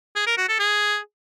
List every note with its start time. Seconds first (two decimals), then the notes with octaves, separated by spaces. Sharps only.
0.16 G#4
0.27 A#4
0.38 F#4
0.48 A4
0.59 G#4